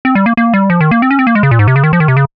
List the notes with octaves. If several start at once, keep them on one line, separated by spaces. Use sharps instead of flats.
C4
G3
A#3
A#3
G3
F3
D#3
A#3
C4
C#4
C4
A#3
G#3
C#3
A#2
G#2
C3
C#3
D#3
F3
D#3
C3
C#3